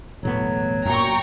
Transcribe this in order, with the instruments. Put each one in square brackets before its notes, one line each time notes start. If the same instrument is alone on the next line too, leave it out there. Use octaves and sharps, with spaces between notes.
[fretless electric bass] E1 A2 B3 [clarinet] F#3
[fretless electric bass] F#2 A#2 [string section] G5 A#5 C#6